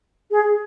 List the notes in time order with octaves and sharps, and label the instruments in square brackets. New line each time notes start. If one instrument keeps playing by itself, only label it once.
[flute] G#4